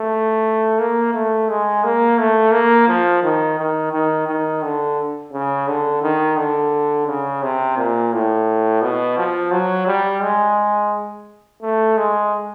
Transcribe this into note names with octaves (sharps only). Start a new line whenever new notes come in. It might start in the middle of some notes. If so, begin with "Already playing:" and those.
Already playing: A3
A#3
A3
G#3
A#3
A3
A#3
F3
D#3
D#3
D#3
D#3
D3
C#3
D3
D#3
D3
C#3
C3
A#2
A2
B2
F3
F#3
G3
G#3
A3
G#3